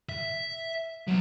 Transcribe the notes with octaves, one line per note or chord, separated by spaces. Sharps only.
E5
F#3 B3